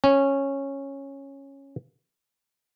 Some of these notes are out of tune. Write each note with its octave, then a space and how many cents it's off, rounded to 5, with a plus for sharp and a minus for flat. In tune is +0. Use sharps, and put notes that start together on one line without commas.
C#4 -10